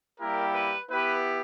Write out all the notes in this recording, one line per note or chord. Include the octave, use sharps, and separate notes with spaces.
G3 A#3 E4 G4 A#4
B4
B3 E4 G4 B4